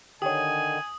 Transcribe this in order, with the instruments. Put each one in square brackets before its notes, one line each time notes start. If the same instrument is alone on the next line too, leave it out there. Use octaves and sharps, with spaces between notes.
[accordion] D3 D#3 [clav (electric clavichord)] G4 C#5 [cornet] G#5 [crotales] D#6